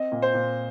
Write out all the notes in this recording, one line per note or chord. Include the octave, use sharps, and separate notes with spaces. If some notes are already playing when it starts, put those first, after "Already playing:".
Already playing: C4 D#5
A#2
C5
A#2